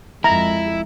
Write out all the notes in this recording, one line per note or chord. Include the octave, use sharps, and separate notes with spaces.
F2 G#3 E4 A#5